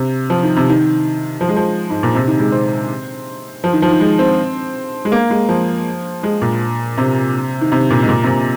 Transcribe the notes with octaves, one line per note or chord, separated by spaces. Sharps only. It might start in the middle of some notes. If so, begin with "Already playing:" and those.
Already playing: C3
F3
D#3
C3
D#3
F3
G#3
F3
G#2
A#2
C3
D#3
G#3
C4
F3
D#3
F3
D#3
G#3
C4
G#3
A#3
G#3
F3
G#3
A#2
C3
D#3
C3
A#2
G#2
A#2
C3
A#2